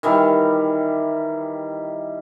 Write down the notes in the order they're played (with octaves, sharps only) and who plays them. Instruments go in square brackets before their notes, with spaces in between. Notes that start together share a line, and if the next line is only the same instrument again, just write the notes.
[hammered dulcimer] D#3 E3 G3